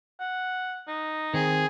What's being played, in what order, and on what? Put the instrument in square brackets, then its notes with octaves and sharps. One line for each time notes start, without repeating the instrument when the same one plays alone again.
[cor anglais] F#5
D#4
[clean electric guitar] D#3 C4 [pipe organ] G#4